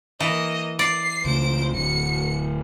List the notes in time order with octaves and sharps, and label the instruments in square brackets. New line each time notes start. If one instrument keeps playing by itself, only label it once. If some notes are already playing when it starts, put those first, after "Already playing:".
[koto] E3 [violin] A#3 D#5
[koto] D5 [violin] C7
[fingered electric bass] C#2 C#3 A3 [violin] C5 D7
[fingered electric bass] D1 D2 [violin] C#7